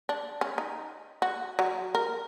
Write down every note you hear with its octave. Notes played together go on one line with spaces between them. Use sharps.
D4
C#4
D#4
F#4
F#3
A#4